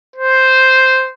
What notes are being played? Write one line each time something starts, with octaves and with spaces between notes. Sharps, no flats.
C5